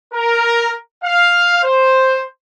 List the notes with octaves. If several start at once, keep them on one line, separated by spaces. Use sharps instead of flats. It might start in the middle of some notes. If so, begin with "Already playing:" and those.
A#4
F5
C5